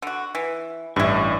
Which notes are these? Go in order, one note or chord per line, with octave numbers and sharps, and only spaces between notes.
D3 F#4
E3
A1 G2 E4 C#6